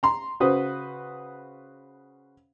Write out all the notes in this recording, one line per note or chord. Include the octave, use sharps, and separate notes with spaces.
A#5 C6
C#3 F#4 B4 C5 D#6